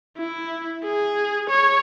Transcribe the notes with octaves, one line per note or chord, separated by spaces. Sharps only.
E4
G#4
C#5